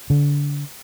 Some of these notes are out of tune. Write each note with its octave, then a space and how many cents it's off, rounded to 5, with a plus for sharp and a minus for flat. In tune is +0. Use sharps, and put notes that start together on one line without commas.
D3 -30